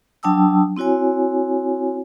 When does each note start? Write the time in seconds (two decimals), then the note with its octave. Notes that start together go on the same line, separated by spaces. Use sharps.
0.23 F#3 D4 G5 A5 D#6 E6
0.76 C4 E4 F#4 C#5 G#5